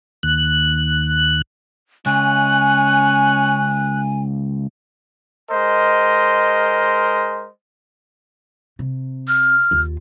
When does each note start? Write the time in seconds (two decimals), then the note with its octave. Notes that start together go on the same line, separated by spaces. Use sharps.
0.23 D#2 F#6
2.06 C#2 C#4 G#5 F#6
5.50 G#3 A#4 C5 D#5
8.79 C3
9.28 F6
9.71 D#2 F4